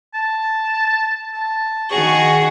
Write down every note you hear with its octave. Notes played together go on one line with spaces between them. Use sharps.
A5
A5
D#3 F#4 G#4 C#6